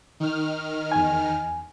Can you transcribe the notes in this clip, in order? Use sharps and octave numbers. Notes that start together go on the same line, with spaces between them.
D#3 F6
E2 G#5